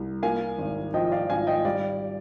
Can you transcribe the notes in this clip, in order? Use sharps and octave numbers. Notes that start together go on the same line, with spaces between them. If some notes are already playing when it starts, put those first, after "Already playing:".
Already playing: C2
A#3 F5 G#5
G#1
F3 D#5 G5
D5 F5
G#1 F5 G#5
D#5 G5
G3 D5 F5